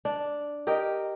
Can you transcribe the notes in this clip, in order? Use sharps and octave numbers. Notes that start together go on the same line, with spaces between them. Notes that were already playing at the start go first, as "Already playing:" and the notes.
D4
G4 A#4 D#5 G5